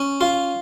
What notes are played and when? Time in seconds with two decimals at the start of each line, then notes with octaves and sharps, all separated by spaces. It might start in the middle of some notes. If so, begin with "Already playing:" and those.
Already playing: C#4
0.21 F4